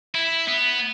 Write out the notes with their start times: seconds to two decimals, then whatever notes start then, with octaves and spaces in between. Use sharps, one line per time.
0.15 E4
0.48 B3